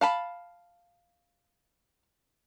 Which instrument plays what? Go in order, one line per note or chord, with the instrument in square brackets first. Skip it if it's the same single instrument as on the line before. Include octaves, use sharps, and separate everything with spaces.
[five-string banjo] F5 A5 B5